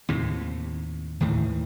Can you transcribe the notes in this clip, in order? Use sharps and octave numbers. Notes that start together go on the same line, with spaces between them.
D#2 A2 C3
D#2 A2 D#3 E3